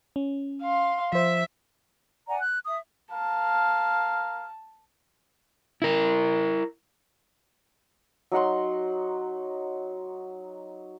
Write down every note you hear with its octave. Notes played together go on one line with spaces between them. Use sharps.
C#4
F5 C6
F3 C5 E5
D5 F#5 G#5 A#5
F#6
E5 D#6
A#4 F5 A5
E4 A#4
F#3 D#4 F#5 C6